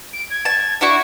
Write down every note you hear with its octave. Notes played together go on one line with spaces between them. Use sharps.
D7
G#6
A5
D4 E4 F#4 G#6